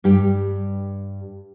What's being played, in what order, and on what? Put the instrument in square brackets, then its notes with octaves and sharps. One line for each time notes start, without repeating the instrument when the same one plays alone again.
[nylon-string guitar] G2 G3 G4